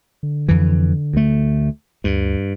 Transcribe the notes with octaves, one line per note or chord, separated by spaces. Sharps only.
D3
F2 E3
D2 A3
D2 G2